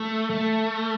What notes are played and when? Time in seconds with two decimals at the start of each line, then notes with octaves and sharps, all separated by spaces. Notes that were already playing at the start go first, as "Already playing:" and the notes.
Already playing: A3
0.30 A3